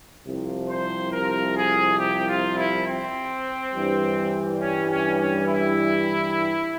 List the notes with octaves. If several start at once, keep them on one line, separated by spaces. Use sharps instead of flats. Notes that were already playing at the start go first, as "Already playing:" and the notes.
C2 C3 F3
C5
A#4
G#4
G4
F4
E4
C4
G2 E3 G3
C#4
C#4
C#4
E4